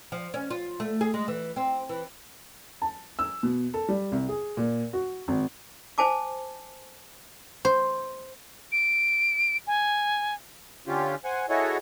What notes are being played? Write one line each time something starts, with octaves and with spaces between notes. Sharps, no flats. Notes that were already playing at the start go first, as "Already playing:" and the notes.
F3
C#4
F4
A3
G#4
G#3
E3
C4
E3
A5
E6
B2
A4
G3
C2
G#4
A#2
F#4
G#1
C5 G#5 A5 D6
C5
D7
G#5
D3 C#4 F4 G4
C5 F#5 G#5
E4 F#4 G#4 A4 C#5 D#5